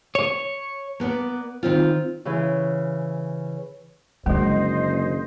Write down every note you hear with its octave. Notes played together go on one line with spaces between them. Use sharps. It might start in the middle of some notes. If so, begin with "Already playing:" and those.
C#5
A#3 B3 B4 D5
D#3 C4 F4
C#3 E3
F#1 D3 F3 G#3 C5 D#5